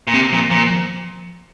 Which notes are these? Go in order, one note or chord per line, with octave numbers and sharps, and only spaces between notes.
A#2
C3 C4
A#2 F3
A#2 F3
F3